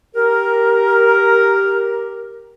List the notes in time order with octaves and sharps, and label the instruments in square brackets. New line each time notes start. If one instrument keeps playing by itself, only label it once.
[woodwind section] G4 A#4